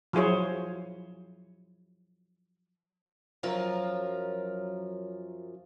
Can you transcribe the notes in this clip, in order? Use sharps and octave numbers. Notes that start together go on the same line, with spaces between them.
F3 F#3 E4 G#4 C5 C#5
F#2 F3 F#3 F4 A#4